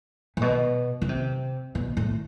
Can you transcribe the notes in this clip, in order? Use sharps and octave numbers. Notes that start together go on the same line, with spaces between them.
A#2
B2
C#3
C3
B2
A2